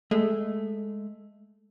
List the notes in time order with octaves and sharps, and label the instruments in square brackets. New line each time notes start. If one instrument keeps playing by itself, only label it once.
[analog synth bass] G#3 [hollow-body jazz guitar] A3